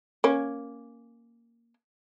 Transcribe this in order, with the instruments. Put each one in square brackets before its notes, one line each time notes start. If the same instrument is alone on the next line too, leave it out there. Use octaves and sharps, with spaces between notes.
[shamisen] A#3 C#4